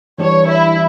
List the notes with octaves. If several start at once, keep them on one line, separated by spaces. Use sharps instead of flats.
E3 G3 D4 G4 C#5
E4